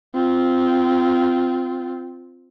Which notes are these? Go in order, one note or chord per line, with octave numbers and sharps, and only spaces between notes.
C4 F4